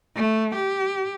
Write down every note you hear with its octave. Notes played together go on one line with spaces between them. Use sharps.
A3
G4